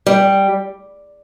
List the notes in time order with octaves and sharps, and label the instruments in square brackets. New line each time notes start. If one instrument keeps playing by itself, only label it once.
[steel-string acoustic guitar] G3